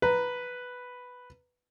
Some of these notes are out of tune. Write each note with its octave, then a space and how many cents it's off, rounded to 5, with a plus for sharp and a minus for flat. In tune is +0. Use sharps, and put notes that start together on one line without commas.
B4 +0 A#5 +0